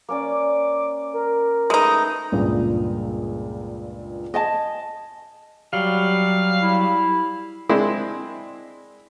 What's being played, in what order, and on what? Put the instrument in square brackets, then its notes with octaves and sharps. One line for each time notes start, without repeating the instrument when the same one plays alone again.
[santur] A#3 C#4 D5 [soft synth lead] D6
[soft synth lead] A#4
[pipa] G#3 D#4 [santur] A3 B4 E5
[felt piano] C#2 G2 A#2
[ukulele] D#5 G#5 A5
[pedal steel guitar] F#3 [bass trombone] G3 [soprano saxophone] F5
[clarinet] E4
[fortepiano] G#3 C4 D4 E4